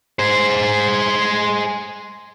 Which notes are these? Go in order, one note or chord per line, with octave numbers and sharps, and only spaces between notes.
G#4 C5